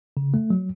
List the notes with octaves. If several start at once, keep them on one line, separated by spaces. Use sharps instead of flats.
C#3
A3
F#3